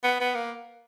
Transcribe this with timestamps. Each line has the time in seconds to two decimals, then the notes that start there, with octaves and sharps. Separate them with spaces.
0.04 B3
0.20 B3
0.35 A#3